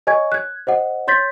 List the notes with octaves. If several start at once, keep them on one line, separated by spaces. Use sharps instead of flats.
C#5 D#5 G#5 C#6 G#6
F#6 G#6
C5 D#5 F#5
C#5 C6 G6 A6 B6